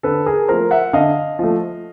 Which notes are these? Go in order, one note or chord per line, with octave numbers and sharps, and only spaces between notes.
D3 A4 B4
G#4 A#4
F3 A3 A#4 C5
E5 F#5
D3 D#5 F5
F3 A3